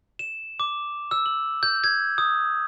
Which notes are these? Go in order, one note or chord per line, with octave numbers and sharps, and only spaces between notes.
E7
D6
E6
F#7
G6
G#6
D#6